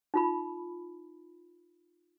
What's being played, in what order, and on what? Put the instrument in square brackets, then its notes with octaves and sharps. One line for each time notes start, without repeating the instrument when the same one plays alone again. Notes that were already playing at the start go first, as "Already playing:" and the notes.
[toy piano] D#4 F4 B5